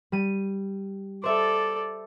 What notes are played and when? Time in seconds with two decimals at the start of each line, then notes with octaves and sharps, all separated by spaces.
0.12 G3 D#7
1.24 A4 C5 D5 E5